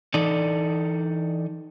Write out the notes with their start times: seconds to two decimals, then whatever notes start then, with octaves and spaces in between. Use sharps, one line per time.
0.14 E3 D#4 A4 D5